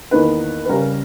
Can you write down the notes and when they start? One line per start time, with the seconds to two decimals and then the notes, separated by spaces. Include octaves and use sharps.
0.11 E2 D#3 A#3 D#4 B4
0.65 B4
0.69 C#3 G3 C#4 A#4